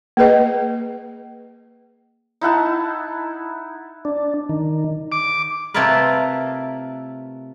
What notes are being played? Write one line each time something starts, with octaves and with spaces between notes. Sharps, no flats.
A#3 G#4 B4 D#5
D#4 E4 F#5 A5
D4
D#3
D6
C3 A3 E4 F4 A#4 B4